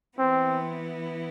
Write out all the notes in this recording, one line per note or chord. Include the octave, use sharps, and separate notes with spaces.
E3 B3 C4 E4